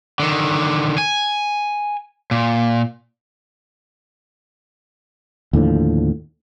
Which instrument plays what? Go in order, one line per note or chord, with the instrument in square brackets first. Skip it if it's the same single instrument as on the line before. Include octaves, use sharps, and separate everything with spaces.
[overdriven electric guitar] D3 D#3
G#5
A#2
[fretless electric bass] D#2 A2 D3 F3